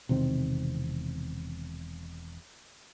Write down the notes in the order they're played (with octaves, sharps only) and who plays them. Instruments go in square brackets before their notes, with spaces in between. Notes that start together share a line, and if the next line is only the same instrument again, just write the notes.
[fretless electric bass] E1 C3 D#3 C4